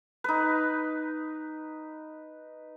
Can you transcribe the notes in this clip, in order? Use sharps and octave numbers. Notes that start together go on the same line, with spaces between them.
D#4 B4